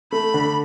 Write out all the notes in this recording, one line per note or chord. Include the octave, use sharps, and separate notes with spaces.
A3 B5
D3